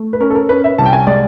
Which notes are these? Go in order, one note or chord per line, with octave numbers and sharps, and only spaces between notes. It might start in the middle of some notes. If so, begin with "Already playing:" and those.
Already playing: A3
B4
C#4 A#4
A4
A#4
C#4 B4
E5
C2 A5
G5
G#5
G#3 D5